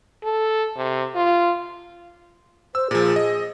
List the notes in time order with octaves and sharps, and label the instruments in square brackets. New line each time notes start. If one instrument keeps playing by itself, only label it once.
[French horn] A4
C3
F4
[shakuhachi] C5 [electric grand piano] E6
[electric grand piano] A#2 F3 [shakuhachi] G#4
[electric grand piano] D#5